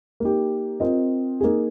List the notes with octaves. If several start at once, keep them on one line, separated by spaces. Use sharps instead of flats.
A#3 D#4 G4
C4 F4 A#4 D#5
A#3 D#4 G#4